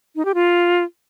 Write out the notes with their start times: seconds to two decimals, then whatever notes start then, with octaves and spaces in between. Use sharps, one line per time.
0.16 D#4
0.25 G4
0.34 F4